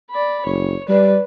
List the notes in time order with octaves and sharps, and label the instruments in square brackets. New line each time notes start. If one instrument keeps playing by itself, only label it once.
[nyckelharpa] D5 B5
[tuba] F#1 [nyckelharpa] C#5
[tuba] G3 [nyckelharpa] B4 [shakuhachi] D5